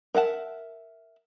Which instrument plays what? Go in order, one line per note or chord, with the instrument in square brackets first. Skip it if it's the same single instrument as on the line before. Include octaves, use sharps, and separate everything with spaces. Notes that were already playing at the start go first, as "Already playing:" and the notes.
[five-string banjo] A#4 E5 F#5 A5